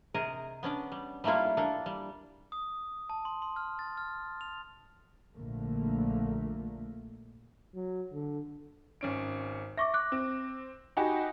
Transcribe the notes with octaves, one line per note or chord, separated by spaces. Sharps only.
C3 G#4 A#4 D#5
B3 C#4 D4 D5
G3
G3 A3 A#3 E4 F4
A#3 D4 A4
G3
D#6
A5
C6
C6
F6
A6
F6
F7
A#1 D3 A3 A#3
F#3
D3
G#1 C#4 D7
E5 C#6 D6 A#6
D6 F#6
C4
D#4 F#4 G4 G5 G#5 B5